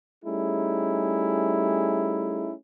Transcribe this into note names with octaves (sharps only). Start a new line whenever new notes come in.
G3 A3 C#4 D#4 E4 G#4